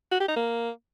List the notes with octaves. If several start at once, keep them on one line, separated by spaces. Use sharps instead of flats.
F#4
G4
D#4
A#3